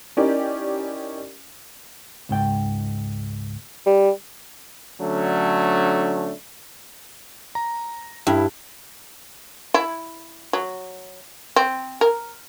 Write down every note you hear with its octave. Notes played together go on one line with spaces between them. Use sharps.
C#4 D#4 E4 G4 A#4 D5
C#2 G#2 G5
G3
D3 F#3 A3 C#4 D4
A#5
G2 E4
E4
F#3
C4
A#4